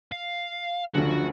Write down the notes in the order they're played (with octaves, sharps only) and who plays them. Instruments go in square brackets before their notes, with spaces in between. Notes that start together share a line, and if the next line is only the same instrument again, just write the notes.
[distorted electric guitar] F5
[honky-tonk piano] F#1 D2 [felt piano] D3 F3 [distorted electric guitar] F#4